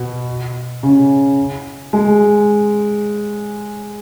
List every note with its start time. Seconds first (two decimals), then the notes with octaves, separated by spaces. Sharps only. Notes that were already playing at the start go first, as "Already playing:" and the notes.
Already playing: B2
0.83 C#3
1.93 G#3